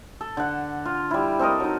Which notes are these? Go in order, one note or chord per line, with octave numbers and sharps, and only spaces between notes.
A4
D3 F#5
F4
G3 E4
C4 A4 A#4 D#5
F#3 D#4